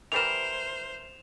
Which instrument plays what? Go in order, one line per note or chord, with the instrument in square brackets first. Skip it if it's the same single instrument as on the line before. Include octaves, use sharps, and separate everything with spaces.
[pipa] E3 G3 A#4 [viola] C5 [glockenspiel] E7 F7